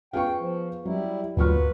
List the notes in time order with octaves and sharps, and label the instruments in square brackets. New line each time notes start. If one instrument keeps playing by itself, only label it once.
[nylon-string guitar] B3 F4 G#4 [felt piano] F5 C#6 [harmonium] G5
[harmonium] F3
[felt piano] F#3 [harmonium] G3 E4
[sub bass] D2 [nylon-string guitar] G2 A#2 F#3 [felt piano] F4 C#6 F6 [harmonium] B4